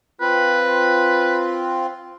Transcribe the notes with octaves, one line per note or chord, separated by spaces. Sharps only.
C4 F4 B4